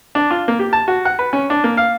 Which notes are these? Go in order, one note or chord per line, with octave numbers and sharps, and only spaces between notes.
D4
F4
A#3
G4
A5
F#4
F#5
B4
C#4
D4
A#3
F5